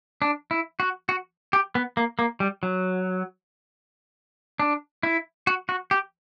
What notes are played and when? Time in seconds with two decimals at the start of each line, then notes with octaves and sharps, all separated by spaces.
0.22 D4
0.51 E4
0.80 F#4
1.09 F#4
1.53 G4
1.75 B3
1.97 A#3
2.19 A#3
2.40 G3
2.63 F#3
4.60 D4
5.03 E4
5.47 F#4
5.69 F#4
5.91 G4